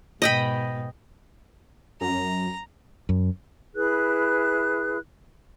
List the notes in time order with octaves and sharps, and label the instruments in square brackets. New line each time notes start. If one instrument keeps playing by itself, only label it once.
[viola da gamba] G#2 B2 [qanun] D#5 G5 B5
[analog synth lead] F#2 [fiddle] A#5
[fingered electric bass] F#2
[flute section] E4 G#4 B4 F#6